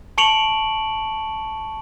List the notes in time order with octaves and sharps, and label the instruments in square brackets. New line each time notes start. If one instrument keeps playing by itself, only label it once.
[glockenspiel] A5 C#6 C#7 D7 F7 F#7